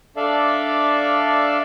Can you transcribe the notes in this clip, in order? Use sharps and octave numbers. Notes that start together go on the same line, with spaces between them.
D4 A4 D5 E5 F5